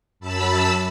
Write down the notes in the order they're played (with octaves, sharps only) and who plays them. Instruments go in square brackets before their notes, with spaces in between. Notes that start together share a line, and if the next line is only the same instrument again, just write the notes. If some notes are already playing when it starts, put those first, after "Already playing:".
[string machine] F#2 A5 B5 E6